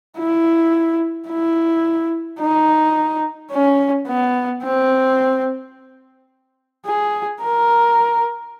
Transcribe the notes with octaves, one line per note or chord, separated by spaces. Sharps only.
E4
E4
D#4
C#4
B3
C4
G#4
A#4